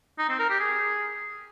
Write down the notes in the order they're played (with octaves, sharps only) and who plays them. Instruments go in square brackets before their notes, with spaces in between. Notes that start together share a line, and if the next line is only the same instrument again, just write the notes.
[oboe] D#4
C4
A#4
G4
G#4